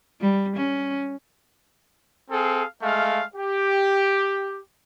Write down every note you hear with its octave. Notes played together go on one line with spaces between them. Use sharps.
G3
C#4
C4 G#4 A4 F5
G#3 A3 F5
G4